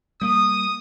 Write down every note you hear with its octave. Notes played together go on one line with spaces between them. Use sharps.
G3 A#3 D#6